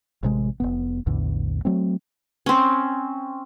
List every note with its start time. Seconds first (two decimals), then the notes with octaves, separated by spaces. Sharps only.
0.23 A1 C3 G#3
0.60 F1 F#2 B3
1.06 A#1 E2 A2 D3
1.65 F#3 A3 C4
2.46 C4 C#4